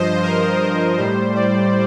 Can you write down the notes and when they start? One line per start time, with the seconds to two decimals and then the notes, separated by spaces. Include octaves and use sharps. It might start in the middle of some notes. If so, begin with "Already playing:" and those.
Already playing: G2 F3 C5 D#5
0.23 A#4
0.61 C5
0.97 A2 G3 C5
1.35 D5